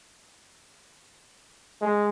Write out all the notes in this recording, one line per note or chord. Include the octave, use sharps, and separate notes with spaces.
G#3